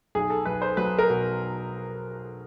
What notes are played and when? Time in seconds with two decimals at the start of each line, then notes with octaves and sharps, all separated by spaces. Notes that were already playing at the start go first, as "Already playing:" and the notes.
0.15 B1 G#4
0.30 A4
0.45 B1 B4
0.62 C5
0.77 F#3 B4
0.99 A#4
1.09 B2